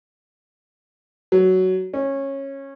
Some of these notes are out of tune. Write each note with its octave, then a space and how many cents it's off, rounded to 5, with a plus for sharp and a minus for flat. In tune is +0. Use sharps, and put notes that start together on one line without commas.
F#3 +10
C#4 -15